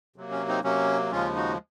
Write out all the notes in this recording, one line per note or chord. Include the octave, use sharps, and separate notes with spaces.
C3 F#3 A#3
C#4
C4 D#4
C3 F#3 A#3 C#4
D#2 C#3 F3 G#3 C#4 F4
D#4 F#4